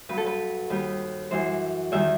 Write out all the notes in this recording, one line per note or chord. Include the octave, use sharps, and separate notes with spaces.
G2 F#3 B4
A4
B4
D#2 D#3 G3 B4
F#2 E3 G3 C5
E2 D#3 G3 E5